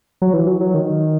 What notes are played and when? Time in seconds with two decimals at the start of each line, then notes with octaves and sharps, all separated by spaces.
0.22 F#3
0.33 E3
0.47 F#3
0.60 F#3
0.74 D#3